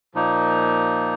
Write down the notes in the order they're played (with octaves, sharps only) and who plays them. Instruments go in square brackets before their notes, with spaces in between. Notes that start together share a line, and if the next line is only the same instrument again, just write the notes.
[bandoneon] A#2 F3 A#3 D#4